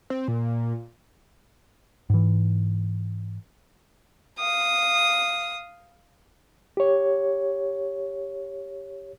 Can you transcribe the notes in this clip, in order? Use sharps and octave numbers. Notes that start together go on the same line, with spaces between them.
C4
A#2
G#2 E3
F5 D#6
G4 C#5